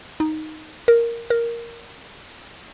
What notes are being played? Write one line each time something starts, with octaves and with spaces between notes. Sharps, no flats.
D#4
A#4
A#4